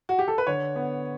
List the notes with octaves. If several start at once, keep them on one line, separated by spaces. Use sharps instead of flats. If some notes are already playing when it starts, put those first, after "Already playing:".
F#4
G4
A4
B4
D3 C#5
B3